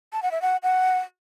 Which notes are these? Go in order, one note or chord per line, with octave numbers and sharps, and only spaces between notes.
A5
F#5
E5
F#5
F#5